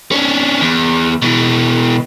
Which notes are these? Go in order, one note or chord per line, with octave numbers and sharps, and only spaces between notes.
C#4 D4
E2
B2 E3